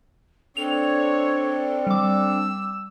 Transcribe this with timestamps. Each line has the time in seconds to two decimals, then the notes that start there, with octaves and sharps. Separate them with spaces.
0.57 C4 D4 A4 C#5 F7
1.87 G3 D6 E6